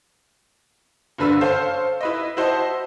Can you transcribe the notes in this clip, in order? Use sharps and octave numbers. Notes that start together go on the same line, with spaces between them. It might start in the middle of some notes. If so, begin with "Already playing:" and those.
F#1 G2 D3 B4 E6
A4 C5 C#5 F5
E4 B4 D#5
E4 F#4 C5 D#5 A5